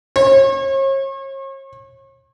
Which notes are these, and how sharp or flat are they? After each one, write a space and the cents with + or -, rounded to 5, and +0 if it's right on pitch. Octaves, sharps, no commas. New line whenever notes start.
C#5 -40